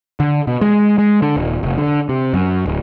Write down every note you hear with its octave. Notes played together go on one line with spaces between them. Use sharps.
D3
B2
G#3
G#3
D3
D#1
F1
D3
C3
F#2
D1